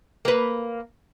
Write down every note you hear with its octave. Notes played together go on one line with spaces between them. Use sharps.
A#3 B4